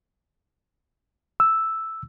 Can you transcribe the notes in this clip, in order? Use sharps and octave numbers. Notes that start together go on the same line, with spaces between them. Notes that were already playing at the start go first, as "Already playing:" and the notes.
E6